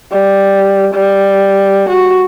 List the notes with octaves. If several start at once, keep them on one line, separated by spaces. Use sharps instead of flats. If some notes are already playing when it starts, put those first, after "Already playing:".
G3
G3
F#4